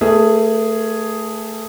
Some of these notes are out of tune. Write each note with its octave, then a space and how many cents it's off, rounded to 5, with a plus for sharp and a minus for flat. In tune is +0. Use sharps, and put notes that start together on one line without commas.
A3 +15 G#4 +0 B4 -40